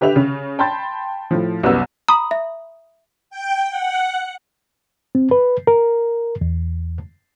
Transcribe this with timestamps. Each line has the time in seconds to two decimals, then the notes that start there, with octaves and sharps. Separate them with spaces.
0.01 D3 G4 B4 E5 F7
0.16 C#3
0.59 G5 A5 B5 C6 G6 A6
1.31 A2 F3
1.63 C2 F#2 B3 E6
2.08 A#5 B5 D#6
2.31 E5
3.30 G5
3.70 F#5
5.15 C4
5.31 B4
5.67 A#4
6.41 E2